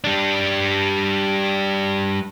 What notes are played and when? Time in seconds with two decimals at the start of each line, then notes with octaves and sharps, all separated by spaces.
0.04 G3 D4